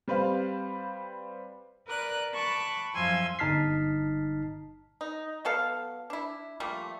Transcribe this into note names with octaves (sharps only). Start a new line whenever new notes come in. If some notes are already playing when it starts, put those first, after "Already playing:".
G3 C4 B4 C5 F5
A#4 B4 D5 F#6
A5 B5 C#6 D6 F#6
F#2 F3 F5 G#5 C6 E6
G1 D#4 A5 F6 B6 C7
D#4
F#3 B3 A4 F5
D4 E4
F3 G3 A3 A#3